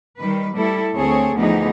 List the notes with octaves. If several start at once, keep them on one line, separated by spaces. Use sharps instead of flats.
D#3 G3 B4
G3 A3 E4 A4
D2 C4 G#4 A4 C#5
D2 E3 F3 B3 D#4 G#4